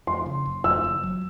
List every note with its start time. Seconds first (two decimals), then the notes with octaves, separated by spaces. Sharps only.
0.07 F2 C6
0.26 C#3
0.45 F#1
0.64 F2 E6
0.84 F#1
1.03 F#3